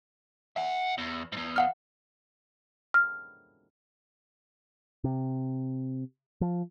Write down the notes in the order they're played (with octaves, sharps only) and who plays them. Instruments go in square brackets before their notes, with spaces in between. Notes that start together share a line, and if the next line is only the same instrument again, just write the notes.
[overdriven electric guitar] E5 F#5
E2
E2 G#2
[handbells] F5 F#5 F6
[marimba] F6
[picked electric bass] C3
F3